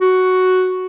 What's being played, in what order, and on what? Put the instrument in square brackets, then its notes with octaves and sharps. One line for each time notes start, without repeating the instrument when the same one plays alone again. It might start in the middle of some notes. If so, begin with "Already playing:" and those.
[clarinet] F#4